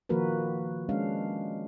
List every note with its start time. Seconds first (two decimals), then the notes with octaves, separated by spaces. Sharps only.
0.09 D#3 F3 A#3 F#4 A#4 B4
0.89 G#3 C#4 D4 F5